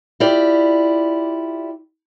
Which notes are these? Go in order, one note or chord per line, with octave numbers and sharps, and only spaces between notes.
E4 F4 G4 D5